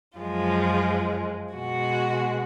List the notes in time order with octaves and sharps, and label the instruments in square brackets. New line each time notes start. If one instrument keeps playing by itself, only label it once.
[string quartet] F#2 F3 G#3 F4
B2 G#3 F#4